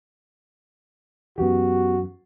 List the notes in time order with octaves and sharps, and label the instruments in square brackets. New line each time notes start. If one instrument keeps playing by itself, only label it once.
[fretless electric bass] F#2 E3 [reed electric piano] B3 G4 [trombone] F#4